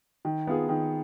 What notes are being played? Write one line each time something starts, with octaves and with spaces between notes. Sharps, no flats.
D#3
B3 F4 G#4
D#3